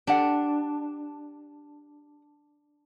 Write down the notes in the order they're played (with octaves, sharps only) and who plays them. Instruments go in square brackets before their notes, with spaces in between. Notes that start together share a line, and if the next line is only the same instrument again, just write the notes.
[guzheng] D4 [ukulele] G4 F#5